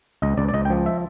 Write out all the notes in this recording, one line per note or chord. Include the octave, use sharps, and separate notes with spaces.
C#2 D#5
C#2 D5
D5
C#2 D#5
G5
F3
E5